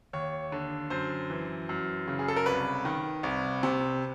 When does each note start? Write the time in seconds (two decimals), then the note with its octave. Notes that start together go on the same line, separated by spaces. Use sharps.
0.13 D#2 C#5
0.52 D3
0.90 F#2 C5
1.30 E3
1.69 F#2
2.08 C#3
2.19 G#4
2.28 A4
2.36 A#4
2.46 C2 B4
2.85 D#3
3.23 C2
3.63 C3